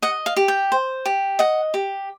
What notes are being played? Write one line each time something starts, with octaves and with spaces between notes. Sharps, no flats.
D#5 F#5
F5
G4
G5
C5
G4
D#5 F#5
G4